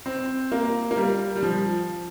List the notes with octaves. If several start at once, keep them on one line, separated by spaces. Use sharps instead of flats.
C4
A#3
A#3
G3
G3
F3